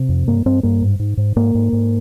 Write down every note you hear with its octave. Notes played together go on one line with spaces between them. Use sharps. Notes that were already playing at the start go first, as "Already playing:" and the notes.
Already playing: C3
F2
G2 A#3
G2 C4
G2 A#3
G#2
G#2
G#2
G#2 A#3
G#2
G#2